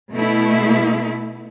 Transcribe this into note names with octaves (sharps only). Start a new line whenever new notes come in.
B2 A3 E4